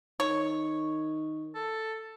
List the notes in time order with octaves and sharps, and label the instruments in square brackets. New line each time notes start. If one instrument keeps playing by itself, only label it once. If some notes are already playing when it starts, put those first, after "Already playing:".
[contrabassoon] D#3 [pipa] C#5
[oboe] A4